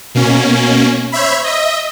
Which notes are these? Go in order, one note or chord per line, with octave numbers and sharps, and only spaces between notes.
B2 A#3 C#4
C5 C#5 E5 B5
D#5 E5